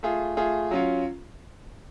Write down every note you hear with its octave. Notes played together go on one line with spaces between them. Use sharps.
A3 F4 G#4
A3 F4 G#4
F#3 C#4 F4